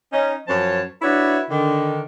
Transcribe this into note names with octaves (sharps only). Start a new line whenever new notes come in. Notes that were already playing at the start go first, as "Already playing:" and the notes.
C#4 D#4
F#2 F3 C5 C#5 A5
D4 E4 F#4 B4 C#5 E5
D3 D#3